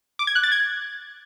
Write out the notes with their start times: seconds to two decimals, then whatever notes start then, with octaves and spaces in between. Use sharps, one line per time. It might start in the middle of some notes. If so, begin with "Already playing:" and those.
0.19 D6
0.27 G#6
0.35 F#6
0.43 A6
0.52 G#6